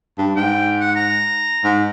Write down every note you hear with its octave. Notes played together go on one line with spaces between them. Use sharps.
G2
G#2 G5
F#5
A#5
G#2